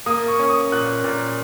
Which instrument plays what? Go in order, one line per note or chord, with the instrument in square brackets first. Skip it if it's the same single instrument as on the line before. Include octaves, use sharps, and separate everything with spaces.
[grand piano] A#3 D#6
C#6
C#4
D#6
A#2 F#6
A#2